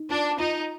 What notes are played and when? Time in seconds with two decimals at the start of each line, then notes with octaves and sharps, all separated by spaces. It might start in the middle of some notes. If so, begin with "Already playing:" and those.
Already playing: D#4
0.09 D4 F4
0.39 D#4 F4